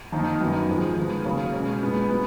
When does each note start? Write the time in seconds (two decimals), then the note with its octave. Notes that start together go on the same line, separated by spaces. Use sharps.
0.12 F2 D#3 A#3 D#4
0.41 F#2 D#3 F#3 B3 D#4
0.68 G#2 F3 G#3
0.97 D#3 G#3 B3
1.25 C#3 F#3 A#3 C#4
1.54 B2 G#3 C#4
1.82 A#2 G#3 B3
2.10 F#3 B3